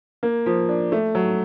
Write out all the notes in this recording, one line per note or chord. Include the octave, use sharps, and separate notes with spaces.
A#3
F3
D4
A3
F#3